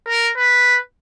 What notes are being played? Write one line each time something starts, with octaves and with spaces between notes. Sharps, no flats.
A#4
B4